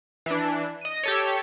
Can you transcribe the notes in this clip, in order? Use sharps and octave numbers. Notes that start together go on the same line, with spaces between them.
E3 D4
D#5 D#7
G4 A4 C#5